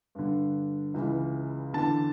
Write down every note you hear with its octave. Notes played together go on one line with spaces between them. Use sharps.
G2 D3
C#2 C#3 E3
E2 D3 A5